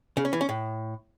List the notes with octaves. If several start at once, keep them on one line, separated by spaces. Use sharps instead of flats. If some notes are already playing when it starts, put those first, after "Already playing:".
C#3
C#4
E3
C#4
A2